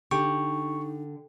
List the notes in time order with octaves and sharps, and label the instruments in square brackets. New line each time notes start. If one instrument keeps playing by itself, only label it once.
[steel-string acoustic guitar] D3 [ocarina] D#4 [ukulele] G4 [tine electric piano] C#6